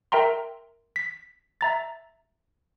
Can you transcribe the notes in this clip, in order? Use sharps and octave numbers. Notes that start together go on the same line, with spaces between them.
A#4 E5 G5 A#5 C6
B6
E5 A#5 A6